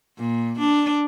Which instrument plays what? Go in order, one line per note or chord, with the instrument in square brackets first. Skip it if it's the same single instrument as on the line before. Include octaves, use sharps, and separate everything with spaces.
[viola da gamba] A#2
D4